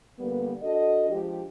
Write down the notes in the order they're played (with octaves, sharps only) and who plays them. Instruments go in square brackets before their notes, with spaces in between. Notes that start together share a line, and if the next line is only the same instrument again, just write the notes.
[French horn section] D3 G3 A#3 B3
D4 F#4 A4 D#5
F3 G#3 D4 G4